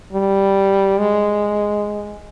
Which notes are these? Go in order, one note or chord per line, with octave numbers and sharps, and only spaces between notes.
G3
G#3